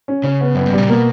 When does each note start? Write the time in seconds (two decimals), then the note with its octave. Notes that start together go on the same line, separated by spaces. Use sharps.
0.08 C#4
0.24 C#3 C#4
0.41 B3
0.55 F#2 B3
0.66 G2
0.73 A#2 G3
0.89 B2 A#3